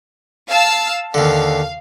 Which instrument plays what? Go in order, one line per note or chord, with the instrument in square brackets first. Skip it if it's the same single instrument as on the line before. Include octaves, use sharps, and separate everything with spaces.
[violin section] F5 A5 E6
[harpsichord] D#2 D3 [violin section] F5